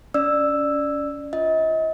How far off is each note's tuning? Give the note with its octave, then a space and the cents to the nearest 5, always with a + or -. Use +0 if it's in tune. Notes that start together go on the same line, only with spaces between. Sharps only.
C#4 +30 D5 +20 E6 +0
F4 -10 D#5 +40